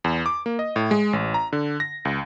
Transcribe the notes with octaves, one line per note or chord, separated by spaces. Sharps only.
E2
D6
A#3
D#5
A2
G#3
A1
A#5
D3
A#6
C#2